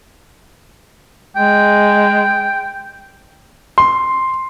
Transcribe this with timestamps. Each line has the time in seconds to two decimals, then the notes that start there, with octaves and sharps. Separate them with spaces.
1.36 G#3 G5
3.78 C6